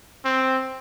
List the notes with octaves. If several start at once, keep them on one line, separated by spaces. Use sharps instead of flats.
C4